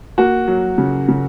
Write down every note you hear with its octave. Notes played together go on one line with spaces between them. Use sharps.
A#3 F#4
F#3
C#3
C#3